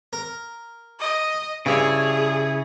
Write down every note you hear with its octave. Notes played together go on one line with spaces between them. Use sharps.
A#4
D#5
G2 C#3 E4 G#4 C#5